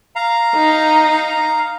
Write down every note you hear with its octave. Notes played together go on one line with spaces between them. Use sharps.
F5 A#5
D#4